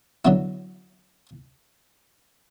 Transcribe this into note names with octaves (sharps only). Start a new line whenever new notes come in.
D3 F#3 B3 E4